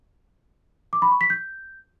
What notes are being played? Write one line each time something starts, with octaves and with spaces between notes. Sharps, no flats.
D6
B5
C#6
B6
G6